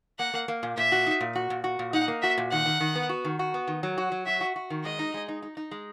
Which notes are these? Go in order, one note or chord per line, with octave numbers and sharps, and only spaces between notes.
A#3 F#5
A#3
A#3
A#2
A#2 E5
F#4
D#4
A#2
F#4
A#2
F#4
A#2
D#4 F#5
A#3
F#4 E5
A#2
D#3 F#5
D#3
D#3
B3
F#4
D#3
F#4
B3
D#3
F#3
F#4
F#3
F#4 E5
F#4
F#4
D#3
G#3 D#5
D#4
G#3
D#4
D#4
D#4
G#3